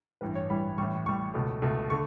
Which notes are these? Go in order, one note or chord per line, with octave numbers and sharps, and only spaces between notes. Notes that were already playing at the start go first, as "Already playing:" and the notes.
A1 G2 E3 G3 B4
C#5
A1 G2 E3 G3 B5
A1 A2 G3 C#6
A1 A2 G3 C#6
C#2 B2 A3
C#2 B2 A3
D3 A3 C#6